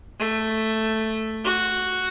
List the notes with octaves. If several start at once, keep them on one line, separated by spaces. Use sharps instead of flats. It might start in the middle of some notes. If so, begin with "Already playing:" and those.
A3
F#4